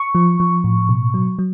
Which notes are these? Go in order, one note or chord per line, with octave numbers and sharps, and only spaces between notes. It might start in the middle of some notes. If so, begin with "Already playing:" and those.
Already playing: C#6
F3
F3
A2
B2
F#3
F#3